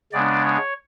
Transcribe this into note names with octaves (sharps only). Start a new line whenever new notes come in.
C#3 G#3 B3 D4 D5
C#5